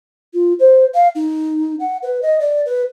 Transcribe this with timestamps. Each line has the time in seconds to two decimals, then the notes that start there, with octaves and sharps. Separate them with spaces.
0.34 F4
0.59 C5
0.94 F5
1.15 D#4
1.80 F#5
2.03 B4
2.22 D#5
2.40 D5
2.66 B4